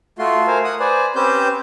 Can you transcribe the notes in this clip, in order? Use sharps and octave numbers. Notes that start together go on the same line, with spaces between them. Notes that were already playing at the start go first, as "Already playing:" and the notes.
A3 F4 F#4 C6
A#4 C5 F5 G#5
F#5 D#6
B4 C5 D5 G#5
C4 C#4 G4 B4 C5 G6